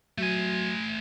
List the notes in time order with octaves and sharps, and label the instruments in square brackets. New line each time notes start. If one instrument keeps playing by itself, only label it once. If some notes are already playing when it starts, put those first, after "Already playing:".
[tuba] F#3 [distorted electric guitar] A3 G#5